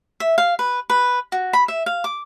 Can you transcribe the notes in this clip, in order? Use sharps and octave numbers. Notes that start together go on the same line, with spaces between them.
E5
F5
B4
B4
F#4
B5
E5
F5
D6